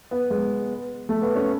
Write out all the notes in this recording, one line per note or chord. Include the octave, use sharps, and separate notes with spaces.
B3
G#3
A3
B3
C#4